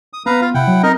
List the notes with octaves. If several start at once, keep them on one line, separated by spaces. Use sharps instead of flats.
D#6
B3 B4 F5 A#5
F4 F5
C3 E4 F#5 G5
F#3
C4 D#4 A#4 D#5